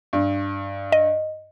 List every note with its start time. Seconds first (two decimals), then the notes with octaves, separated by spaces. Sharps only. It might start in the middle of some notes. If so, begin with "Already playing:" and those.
0.13 G2
0.92 D#5